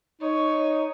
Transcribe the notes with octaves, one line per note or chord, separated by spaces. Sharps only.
D#4 C#5